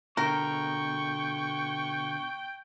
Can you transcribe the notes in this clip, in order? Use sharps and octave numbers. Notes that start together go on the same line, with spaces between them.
B2 D3 A#4 G5 C#6